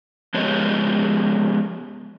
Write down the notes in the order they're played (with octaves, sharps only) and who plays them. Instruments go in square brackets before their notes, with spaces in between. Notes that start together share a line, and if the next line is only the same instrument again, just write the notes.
[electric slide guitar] F3 G#3 B3 G4 C#5 D#5